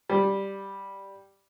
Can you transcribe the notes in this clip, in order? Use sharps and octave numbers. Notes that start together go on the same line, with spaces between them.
G3